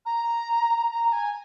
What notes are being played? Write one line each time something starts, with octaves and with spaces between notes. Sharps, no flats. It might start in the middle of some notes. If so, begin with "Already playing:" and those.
A#5
A#5
G#5